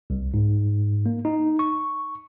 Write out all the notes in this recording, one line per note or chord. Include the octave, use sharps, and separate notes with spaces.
C2
G#2
A#3
D#4
C#6